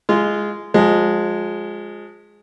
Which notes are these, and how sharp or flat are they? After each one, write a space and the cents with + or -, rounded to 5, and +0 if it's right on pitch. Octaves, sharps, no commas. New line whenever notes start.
G#3 +0 F4 -20
F3 +30 G#3 +0